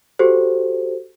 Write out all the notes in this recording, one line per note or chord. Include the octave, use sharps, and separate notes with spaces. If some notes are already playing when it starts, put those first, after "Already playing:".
F#4 G4 A4 C5